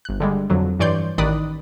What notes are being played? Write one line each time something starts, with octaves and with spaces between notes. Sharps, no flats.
G1 F#6
D3 G3 G#3
F2 D3 F#3
G2 E3 C#5 D5 C6 G6
A1 D#3 D5 B5 D#6 F#6